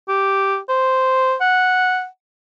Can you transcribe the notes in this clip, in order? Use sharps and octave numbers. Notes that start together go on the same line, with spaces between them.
G4
C5
F#5